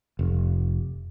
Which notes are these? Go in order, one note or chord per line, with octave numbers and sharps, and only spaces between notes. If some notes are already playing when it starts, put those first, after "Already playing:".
F1